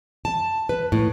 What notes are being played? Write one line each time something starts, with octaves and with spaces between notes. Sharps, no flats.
A5
B4
A2